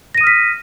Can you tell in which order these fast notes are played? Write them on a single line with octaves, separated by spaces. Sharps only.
A#6 D#7 D#6 F6 B6